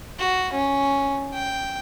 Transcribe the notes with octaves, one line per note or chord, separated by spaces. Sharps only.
F#4
C#4
G5